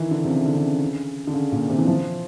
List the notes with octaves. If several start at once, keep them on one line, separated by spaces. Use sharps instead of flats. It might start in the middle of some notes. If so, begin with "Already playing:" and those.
Already playing: D#3 E3
D3
C3
C#3
D3
C#3
D3
C#3
A#2
C3
E3
F3